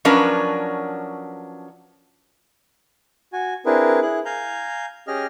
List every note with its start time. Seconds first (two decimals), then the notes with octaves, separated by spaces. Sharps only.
0.05 F3 F#3 C#4 D4 A#4 B4
3.33 F#4 G#5
3.66 C4 D4 E4 G#4 A#4 B4
4.02 E4 G#4 F#6
4.25 F5 G#5 A#5 G6
5.07 C#4 G4 G#4 D#5 F6